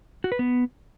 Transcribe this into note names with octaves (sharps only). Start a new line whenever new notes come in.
F#4
B4
B3